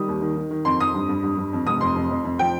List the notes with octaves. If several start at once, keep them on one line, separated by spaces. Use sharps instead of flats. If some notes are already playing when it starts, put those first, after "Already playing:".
Already playing: D#3 G3 D#6
D#2
D#3
D#3
D#3
F2 C6
F2 D#6
G2
G2
G2
G2
F2
F1 D#6
F2 C6
F2
F2
F2
F3 G5